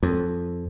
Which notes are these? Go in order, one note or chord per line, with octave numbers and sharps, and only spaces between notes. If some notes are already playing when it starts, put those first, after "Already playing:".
F2